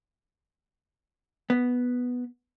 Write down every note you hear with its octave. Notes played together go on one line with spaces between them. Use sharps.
B3